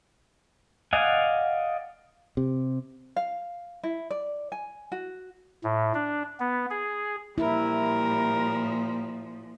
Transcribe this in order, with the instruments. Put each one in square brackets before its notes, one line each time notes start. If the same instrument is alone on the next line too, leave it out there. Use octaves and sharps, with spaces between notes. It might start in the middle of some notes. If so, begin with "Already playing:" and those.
[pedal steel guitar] D5 D#5 F5 F#5 G#5
[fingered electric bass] C3
[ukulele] F5
E4
D5
G#5
F#4
[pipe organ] A2
D4
B3
G#4
[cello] A#2 F3 [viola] G3 A#4 [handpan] E4